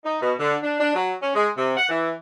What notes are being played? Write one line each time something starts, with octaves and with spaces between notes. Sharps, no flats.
D#4
B2
D3
D4
D4
F#3
C#4
G#3
C3
F#5
E3